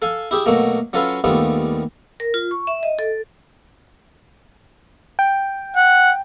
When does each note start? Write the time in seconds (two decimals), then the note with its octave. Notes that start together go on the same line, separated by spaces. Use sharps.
0.02 A4 F5 G#5
0.31 E4 G4 G#4
0.46 B2 F#3 A3 A#3
0.93 F#3 C#4 F4 A4 B4 F5
1.24 D#2 G3 A3 B3 F4
2.20 A#4
2.34 F4
2.51 C#6
2.67 E5
2.83 D#5
2.99 A4
5.19 G5
5.76 F#5